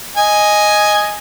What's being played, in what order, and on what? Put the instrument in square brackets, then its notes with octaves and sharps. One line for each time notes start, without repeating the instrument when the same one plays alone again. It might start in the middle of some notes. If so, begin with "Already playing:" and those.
[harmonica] D#5 G#5